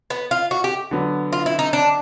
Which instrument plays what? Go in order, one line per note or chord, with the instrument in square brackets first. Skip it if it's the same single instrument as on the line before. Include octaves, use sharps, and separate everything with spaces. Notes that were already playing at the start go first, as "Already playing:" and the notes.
[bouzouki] B3
F4
F#4
G4
[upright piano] D3 F#3 B3
[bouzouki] F4
E4
D#4
D4